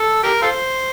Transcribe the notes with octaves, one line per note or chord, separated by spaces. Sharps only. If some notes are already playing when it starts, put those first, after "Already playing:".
Already playing: A4
G4 A#4
F4 A4 C5